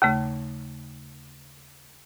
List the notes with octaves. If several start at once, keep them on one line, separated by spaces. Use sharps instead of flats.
D#2 C#3 A3